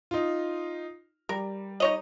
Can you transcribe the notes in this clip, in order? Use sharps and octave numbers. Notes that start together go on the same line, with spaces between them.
D#4 F4
G3 A#4
D#4 C#5 D#5